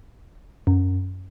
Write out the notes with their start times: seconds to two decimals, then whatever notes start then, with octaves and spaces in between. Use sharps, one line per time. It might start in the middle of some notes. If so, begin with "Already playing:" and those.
0.67 F#2